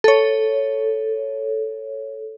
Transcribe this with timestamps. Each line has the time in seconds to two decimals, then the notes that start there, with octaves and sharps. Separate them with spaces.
0.04 A4 C#5